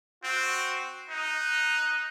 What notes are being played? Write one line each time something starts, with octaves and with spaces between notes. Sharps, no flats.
C4 F#4
D#4 F#6